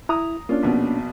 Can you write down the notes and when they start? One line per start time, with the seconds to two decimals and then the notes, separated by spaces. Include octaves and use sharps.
0.09 E4 A#5 D#6
0.49 A#3 C#4 D4 F4
0.63 A#1 B2